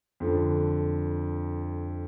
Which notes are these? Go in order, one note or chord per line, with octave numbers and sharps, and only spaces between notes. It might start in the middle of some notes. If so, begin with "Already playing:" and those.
F2 D3